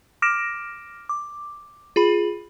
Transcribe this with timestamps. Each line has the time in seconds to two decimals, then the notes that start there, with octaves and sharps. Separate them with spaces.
0.22 D6 F6 A#6 D7 E7
1.09 D6
1.96 F4 G#4 B5